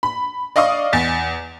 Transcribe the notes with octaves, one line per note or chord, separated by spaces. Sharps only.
B5
D5 D#5 F5 C#6 D#6
E2 A6 B6